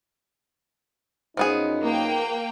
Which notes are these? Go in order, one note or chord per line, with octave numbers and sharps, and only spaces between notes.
F#2 F3 B3 C#4 D#4 G#4
A#3 G5